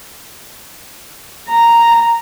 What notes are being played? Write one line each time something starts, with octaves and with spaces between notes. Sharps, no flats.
A#5